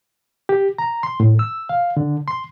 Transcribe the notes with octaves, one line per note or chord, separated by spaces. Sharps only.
G4
A#5
C6
A2
E6
F5
D3
C6